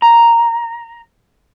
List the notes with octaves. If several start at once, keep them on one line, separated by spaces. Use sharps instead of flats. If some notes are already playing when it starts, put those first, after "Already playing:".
A#5